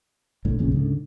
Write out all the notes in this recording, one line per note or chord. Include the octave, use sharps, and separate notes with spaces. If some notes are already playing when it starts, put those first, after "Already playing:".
B1 A2 D3
A1 F2 A#2 C#3
C#2 G#2 D3